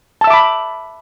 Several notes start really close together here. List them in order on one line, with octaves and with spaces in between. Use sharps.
A5 E6 E5 D6 B5